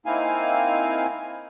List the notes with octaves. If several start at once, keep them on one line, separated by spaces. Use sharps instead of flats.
A#3 C4 D#4 E4 F5 G#5